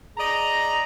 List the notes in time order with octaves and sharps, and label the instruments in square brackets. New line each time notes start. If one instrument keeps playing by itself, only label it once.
[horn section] G#4 D5 D#5 A#5